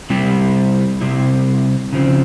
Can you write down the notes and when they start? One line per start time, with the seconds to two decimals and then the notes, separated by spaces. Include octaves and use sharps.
0.10 C3 G3 C4 E4
1.01 C3 G3 C4 E4
1.93 C#3 F3 C4